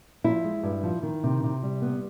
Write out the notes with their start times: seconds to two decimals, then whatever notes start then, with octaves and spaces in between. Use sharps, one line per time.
0.24 F3 E4
0.44 G#3
0.63 G2
0.83 F3
1.03 D#3
1.23 C3
1.43 C3
1.63 G3
1.82 B3